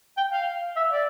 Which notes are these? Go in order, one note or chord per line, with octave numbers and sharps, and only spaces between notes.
G5
F5
E5
D5